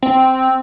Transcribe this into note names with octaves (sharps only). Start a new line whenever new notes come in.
C4